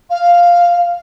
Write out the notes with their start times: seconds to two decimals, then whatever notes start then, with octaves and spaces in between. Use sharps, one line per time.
0.10 F5